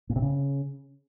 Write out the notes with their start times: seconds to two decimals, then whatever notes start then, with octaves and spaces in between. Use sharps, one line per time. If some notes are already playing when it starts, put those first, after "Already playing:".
0.10 A#2
0.16 C3
0.22 C#3